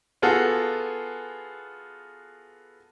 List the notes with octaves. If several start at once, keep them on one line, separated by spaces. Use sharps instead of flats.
B3 F4 F#4 G#4 A4